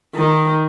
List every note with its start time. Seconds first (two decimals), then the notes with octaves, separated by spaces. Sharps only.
0.15 D#3